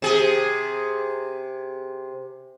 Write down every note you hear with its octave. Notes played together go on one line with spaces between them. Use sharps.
C3 G#4